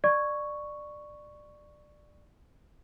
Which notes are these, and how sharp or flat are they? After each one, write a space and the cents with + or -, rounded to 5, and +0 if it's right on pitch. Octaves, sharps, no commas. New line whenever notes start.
D5 +20 C#6 +0